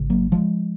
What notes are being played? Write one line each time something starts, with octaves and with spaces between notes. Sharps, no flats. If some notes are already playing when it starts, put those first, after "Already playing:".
Already playing: G#1 C#3
F#3 A#3
F3 G#3